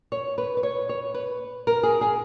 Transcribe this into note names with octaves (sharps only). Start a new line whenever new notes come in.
C#5
B4
B4
C#5
C#5
B4
A#4
G#4
G#4